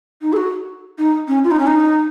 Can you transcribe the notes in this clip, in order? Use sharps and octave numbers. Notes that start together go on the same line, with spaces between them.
D#4
A4
F#4
D#4
C#4
F4
D#4
C#4
D#4